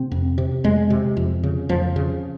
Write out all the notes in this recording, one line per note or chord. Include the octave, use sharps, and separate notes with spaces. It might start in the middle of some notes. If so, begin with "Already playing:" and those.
Already playing: C3 C4
F2
C3
F2 G#3
C3
F2
C#3
F2 F3
C#3